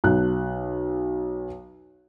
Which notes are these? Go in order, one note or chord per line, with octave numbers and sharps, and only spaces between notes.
B1 F#6